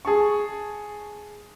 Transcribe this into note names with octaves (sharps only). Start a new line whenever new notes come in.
G#4 A5 C#6